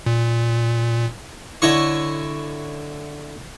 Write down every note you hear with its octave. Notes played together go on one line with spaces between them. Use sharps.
A#2
D3 E4 C#5 D#5 C#6